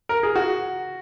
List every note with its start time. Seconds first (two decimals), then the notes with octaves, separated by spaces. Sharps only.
0.09 A#4
0.23 G#4
0.36 F#4